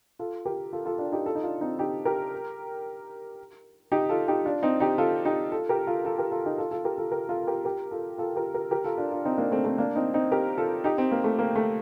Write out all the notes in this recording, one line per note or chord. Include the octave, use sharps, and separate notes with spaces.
F4 A4
G4 A#4
F4 A4
F4 A4
D4 F4
D#4 G4
F4 A4
D#4
D4 F4
C4 D#4
D#4 G4
G4 A#4
D#4 G4
F4 A4
D#4 G4
D4 F4
C4 D#4
D#4 G4
F4 A4
D#4 G4
F4 A4
G4 A#4
F4 A4
F4 A4
G4 A#4
F4 A4
D#4 G4
F4 A4
F4 A4
G4 A#4
F4 A4
G4 A#4
F4 A4
G4 A#4
G4 A#4
F4 A4
F4 A4
G4 A#4
G4 A#4
G4 A#4
F4 A4
D4 F4
D4 F4
C4 D#4
A#3 D4
A3 C4
A3 C4
A#3 D4
C4 D#4
C4 D#4
G4 A#4
F4 A4
D#4 G4
C4 D#4
A#3
A3
A#3
A3